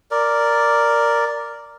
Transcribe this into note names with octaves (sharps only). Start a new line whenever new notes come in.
A#4 D5